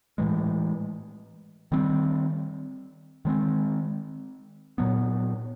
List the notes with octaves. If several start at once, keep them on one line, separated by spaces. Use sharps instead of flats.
A2 E3 G#3
D#3 G3 C4
D#3 G#3 C4
A#2 F#3 B3